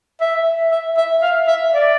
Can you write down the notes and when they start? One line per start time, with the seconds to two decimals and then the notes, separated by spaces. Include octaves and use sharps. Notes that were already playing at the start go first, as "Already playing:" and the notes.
0.21 E5
0.71 E5
0.97 E5
1.22 F5
1.48 E5
1.74 D5